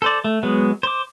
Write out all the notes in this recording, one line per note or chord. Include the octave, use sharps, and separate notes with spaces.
A4 C5 D5
A3
F#3 G#3 B3
C5 D6